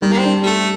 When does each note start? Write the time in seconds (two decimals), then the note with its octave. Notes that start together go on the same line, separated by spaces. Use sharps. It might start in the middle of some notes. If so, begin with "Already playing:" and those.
0.02 D#3 G3
0.12 A#3
0.18 C4
0.25 D4
0.43 G3
0.46 A3 A4